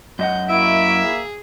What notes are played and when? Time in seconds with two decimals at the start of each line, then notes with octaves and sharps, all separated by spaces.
0.19 F#2 D#5 F#5 G6
0.50 A#3 E4 F#4 E5 D7
1.02 G#4